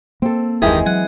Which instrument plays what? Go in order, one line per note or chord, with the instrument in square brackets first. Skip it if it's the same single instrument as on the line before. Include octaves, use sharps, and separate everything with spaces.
[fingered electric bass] A#3 [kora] C4 A4
[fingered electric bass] F#1 D#2 [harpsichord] D#3 G4 G#4 [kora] E3 G#3
[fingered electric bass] F#3 [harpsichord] F#5 G#5